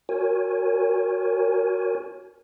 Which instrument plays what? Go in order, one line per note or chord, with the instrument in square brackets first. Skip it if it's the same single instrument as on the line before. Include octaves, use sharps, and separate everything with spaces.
[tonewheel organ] F#4 A#4 C#5 G#5